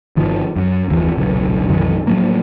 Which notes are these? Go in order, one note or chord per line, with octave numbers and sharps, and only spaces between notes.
G1 D#3 F3
F#2
F#1 D#2 E3 F3
D#1 B1 C#3
C2 F#2 D#3 E3
A2 F3 F#3 A#3